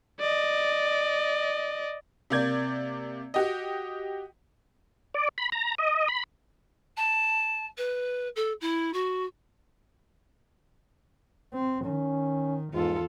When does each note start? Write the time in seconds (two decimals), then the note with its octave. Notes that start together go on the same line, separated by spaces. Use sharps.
0.20 D5 D#5
2.30 C3 A#3 D5 G6 G#6
3.34 F#4 G4 D#5
5.14 D5
5.38 B5
5.52 A#5
5.78 D#5
6.08 B5
6.97 A5
7.77 B4
8.36 A4
8.60 E4
8.93 F#4
11.54 C4
11.85 D#3 C#4
12.74 E2 G#2 F4 A4